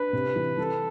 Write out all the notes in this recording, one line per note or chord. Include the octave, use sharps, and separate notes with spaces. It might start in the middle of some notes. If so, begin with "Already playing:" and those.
Already playing: D4 B4
C3
E3
E3 A4